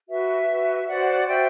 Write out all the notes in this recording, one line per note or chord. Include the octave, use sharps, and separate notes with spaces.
F#4 B4 E5
F#4 B4
F#4 C5 D5 F#5
F#4 C5 E5 G5